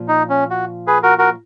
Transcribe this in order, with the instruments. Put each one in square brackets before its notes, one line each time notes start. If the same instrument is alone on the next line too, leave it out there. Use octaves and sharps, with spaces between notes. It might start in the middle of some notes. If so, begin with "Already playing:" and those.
Already playing: [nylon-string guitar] A#2 F3
[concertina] D#4
C#4
F#4
G#4 B4
F#4 A#4
F#4 A#4